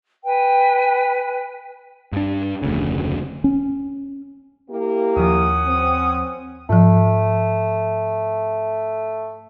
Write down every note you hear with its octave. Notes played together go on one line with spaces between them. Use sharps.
B4 G5 G#5
G2 D4
F1 D2 C#3
C#4
A#3 E4 G4
D#2 F3 C#4 F#5 D#6
C4
G#2 F3 A3